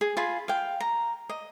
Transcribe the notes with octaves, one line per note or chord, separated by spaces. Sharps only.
G#4
F4 G#4 B5
F5 G5
A#5
D#5